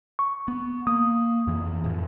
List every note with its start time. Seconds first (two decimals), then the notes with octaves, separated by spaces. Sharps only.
0.19 C#6
0.48 B3
0.87 A#3 D#6
1.47 F2 E3
1.84 F2 A2